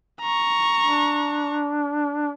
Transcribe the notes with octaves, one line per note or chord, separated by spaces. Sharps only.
A#5 C#6
D4